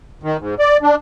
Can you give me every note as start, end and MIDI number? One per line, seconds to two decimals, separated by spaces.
0.23 0.37 51
0.40 0.55 44
0.59 0.77 74
0.82 0.96 62